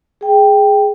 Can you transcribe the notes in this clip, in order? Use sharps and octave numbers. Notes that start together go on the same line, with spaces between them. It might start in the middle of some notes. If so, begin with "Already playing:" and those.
G#4 G5